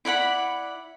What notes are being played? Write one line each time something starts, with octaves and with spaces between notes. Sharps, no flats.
E4 D5 F#5 B5